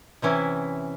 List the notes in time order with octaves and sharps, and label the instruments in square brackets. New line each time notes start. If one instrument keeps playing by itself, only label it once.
[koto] C3 E3 C#4 E4